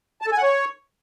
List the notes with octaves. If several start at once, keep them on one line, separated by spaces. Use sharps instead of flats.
A5
A4
G#5
F#5
C#5